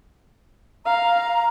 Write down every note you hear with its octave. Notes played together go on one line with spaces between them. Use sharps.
F5 A#5